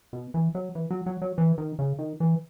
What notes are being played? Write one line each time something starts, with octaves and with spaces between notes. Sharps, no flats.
B2
E3
F#3
E3
F#3
F#3
F#3
E3
D#3
C#3
D#3
E3